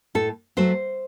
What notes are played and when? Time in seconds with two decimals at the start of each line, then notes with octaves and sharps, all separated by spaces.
0.15 A2 A4
0.57 F#3 A3 C5